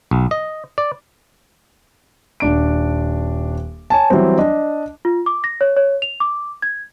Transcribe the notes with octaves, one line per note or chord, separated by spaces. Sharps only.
B1
D#5
D5
D#1 D4 D7
C#5 G#5 A5
E3 F#3 G3 C4
D4 D#5
F4
D6
A#6
C#5
C#5
F7
D6
G#6